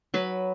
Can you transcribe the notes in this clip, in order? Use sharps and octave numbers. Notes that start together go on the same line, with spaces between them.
F#3 B4